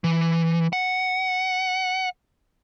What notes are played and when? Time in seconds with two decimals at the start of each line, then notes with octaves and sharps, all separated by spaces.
0.04 E3
0.73 F#5